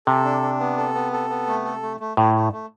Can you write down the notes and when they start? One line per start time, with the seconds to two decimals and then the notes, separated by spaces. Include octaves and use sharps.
0.07 C3 A4
0.24 D4
0.42 D4
0.60 B3
0.77 A4
0.94 B3
1.12 A4
1.30 B3
1.47 A3
1.65 A4
1.83 A3
2.00 A3
2.17 A2 A3
2.35 A3
2.52 A3